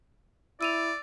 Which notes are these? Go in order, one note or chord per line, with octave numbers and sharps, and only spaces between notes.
E4 D5 E6 D#7 F7